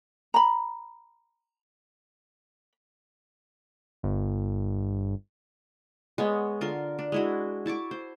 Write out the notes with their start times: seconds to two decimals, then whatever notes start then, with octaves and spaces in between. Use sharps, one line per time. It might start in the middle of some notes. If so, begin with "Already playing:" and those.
0.34 A#5 B5
4.03 G1
6.18 G#3 B3 C#5
6.61 D3 F4 A#4 C6
6.99 D4
7.12 G#3 E4 F#4
7.66 E4 A5 C#6 D6
7.91 C5